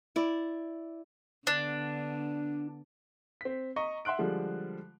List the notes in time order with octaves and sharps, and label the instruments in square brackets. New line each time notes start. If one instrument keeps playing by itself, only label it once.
[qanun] E4 D5
[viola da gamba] D3 B3 [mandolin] D4
[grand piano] C4 B6
D#5 A#5 C#6
E5 F#5 C6 F#6 D7
D3 F3 G3 G#3